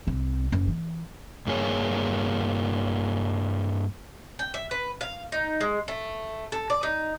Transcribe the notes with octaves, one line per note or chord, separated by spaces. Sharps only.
C2 C4
F#1 C#4
E3
G2 A#3 G#4 C#5
G5
E5
B4
F5
D#4
G#3
A3
A4
D5
D#4